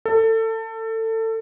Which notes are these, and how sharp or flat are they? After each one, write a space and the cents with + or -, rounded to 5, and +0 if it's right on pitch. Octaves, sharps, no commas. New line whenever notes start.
A4 +25